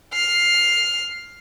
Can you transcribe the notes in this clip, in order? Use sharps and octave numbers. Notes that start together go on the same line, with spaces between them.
F6 C7